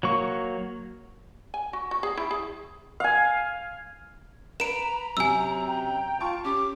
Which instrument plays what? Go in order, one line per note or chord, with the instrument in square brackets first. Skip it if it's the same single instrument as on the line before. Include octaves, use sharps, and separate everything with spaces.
[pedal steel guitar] F#3 A#3 C#6
[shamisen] G#5
F#4
F#4
G#4
E4
G#4
[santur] F5 G#5
[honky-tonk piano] B4 [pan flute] A#5 [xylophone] D7 E7
[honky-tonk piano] F#2 C3 [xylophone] G#5 E6
[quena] G5
[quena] F4 [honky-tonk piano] A5 C#6 D7
[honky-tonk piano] C#4 [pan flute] G4 [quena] D6